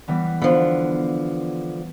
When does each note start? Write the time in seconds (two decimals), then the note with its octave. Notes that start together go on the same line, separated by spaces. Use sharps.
0.08 E3 G3 B3
0.42 D3 F3 B3